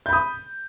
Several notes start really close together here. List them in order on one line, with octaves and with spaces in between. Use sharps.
G6 B5 D#6